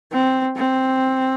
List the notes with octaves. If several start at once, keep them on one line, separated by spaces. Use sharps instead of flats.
C4
C4